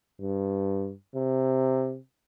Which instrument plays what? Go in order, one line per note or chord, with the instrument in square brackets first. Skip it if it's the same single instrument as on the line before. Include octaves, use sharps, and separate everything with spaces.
[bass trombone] G2
C3